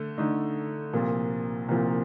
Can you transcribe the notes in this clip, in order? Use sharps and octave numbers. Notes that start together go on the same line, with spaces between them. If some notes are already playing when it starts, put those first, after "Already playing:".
Already playing: D3 A3
D3 A3 D#4
C2 A#2 F3
C2 A#2 F3